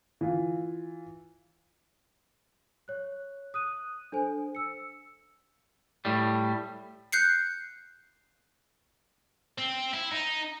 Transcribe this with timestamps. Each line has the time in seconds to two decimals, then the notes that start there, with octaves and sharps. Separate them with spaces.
0.21 E3 F4
2.88 C#5 F#6
3.54 D#6 F#6 D#7
4.12 D4 A4 C5 G#5
4.55 E6 C#7
6.05 A2 G3
7.12 F#6 G6 C7 C#7
9.58 C4
9.93 E4
10.11 D#4